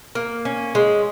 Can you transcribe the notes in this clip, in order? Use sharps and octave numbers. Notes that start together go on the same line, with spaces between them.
A#3
C#4
G#3